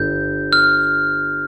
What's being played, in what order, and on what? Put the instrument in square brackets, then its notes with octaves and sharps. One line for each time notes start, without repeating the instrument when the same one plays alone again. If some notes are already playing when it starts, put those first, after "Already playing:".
Already playing: [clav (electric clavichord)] G1 [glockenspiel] G6
[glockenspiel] F6